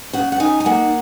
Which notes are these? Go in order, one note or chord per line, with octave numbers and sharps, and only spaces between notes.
C#3 F#5
F#5
D#4 G#5
G#5
A#3 F#5